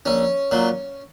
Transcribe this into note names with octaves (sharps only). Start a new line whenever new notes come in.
A#1 C#4
A#2 F#3